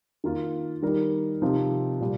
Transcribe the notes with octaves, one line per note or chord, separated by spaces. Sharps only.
D#3 A#3 F4
D#3 G3 D#4 A#4
C3 F3 C4 D#4
A#2 G3